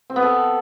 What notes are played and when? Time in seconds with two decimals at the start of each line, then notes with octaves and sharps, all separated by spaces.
0.10 C4
0.16 B3
0.22 A4